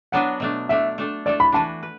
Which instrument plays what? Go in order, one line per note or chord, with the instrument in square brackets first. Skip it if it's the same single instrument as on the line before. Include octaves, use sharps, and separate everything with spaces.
[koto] F#3 B3 D4 F#4 B4 [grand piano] F#5
[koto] B2 A3 D4
[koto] B2 A3 D4 [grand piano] E5
[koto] A3 D4 A4
[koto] A3 D4 A4 [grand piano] D5
[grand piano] B5
[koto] E3 D4 F#4 B4 [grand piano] A5
[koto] B4